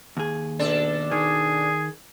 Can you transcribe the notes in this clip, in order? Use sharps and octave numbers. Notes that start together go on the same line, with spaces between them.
D#2 G#4
B2 D4 A4
D#3 G#4